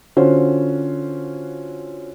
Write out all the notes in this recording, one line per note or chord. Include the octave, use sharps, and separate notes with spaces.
D3 C#4 F4 F#4 C5